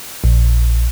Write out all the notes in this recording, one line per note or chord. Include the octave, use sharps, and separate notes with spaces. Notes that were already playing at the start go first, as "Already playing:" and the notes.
A#1